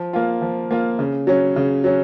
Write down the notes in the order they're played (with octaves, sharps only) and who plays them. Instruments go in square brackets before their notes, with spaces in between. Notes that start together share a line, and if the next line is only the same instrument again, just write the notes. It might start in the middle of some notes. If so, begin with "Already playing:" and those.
Already playing: [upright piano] F3
A#3 F4
F3
A#3 F4
C#3
F#3 C#4
C#3
F#3 C#4